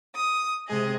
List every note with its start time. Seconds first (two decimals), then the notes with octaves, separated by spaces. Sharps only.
0.15 D#6
0.67 C3 G#3 G#4 D#5